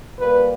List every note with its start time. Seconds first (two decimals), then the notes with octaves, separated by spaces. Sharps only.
0.18 A#2 G3 A#3 B4